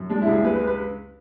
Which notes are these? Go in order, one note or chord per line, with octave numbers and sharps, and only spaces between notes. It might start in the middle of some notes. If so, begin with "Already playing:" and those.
Already playing: F#2
G#3 D4
E4
C#2
G#4
G#3 B4
B4
B4